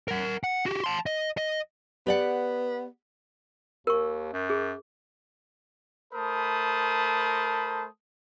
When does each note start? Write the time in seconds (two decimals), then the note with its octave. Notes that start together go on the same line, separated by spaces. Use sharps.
0.08 A#4 F#5
0.44 F#5
0.66 F#4 G4
0.84 A5 C6
1.06 D#5
1.37 D#5
2.07 B3 G4 D5 F#5
3.87 D#2 A#4 C#6
4.33 F#2
4.50 G#4
6.14 A3 A#4 C5 A5 B5 D#6